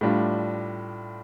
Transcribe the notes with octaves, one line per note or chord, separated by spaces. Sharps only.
A2 G3 D4 F4